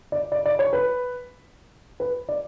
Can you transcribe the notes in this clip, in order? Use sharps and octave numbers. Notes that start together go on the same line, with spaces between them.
D5
D5
D5
C#5
B4
B4
D5